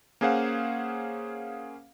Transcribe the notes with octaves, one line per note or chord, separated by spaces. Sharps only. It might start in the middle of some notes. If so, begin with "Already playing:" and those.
A#3 C#4 G#4 C5 F5 F#5